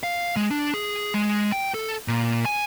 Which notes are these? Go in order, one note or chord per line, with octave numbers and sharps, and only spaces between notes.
F5
G#3
D4
G#4
G#3
G5
A4
A#2
G#5